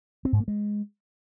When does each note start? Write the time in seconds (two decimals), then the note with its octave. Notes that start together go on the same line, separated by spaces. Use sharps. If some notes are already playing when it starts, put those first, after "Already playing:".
0.25 C4
0.33 G#2
0.40 A#3
0.48 G#3